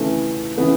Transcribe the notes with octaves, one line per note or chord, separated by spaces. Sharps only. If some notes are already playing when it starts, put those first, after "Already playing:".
Already playing: C#3 E3 A3
C#3 E3 B3